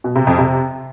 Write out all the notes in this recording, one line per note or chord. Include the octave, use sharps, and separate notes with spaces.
B2
C3
F2
C3